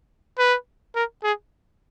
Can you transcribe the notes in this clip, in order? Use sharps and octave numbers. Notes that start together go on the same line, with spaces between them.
B4
A#4
G#4